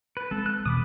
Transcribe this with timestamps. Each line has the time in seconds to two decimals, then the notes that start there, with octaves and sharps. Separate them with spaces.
0.17 B4
0.31 G#3 C4 A4
0.46 F#6
0.65 E1 B2 E3 B5 D6 D#6